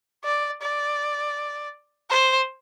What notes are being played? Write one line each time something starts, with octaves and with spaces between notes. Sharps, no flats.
D5
D5
C5